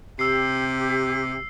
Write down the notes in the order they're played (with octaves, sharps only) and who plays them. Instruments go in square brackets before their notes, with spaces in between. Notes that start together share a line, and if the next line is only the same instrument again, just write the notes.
[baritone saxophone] C3 [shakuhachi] G4 [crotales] E6 C7